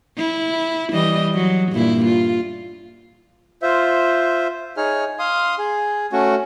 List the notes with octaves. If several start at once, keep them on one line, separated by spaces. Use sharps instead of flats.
E4
E3 G3 D#5
F#3
G2 A#2 E4
F4
F4 C5 E5
D#4 G#4 C#5 F6
F5 C6 D#6
G#4
A3 C#4 F#4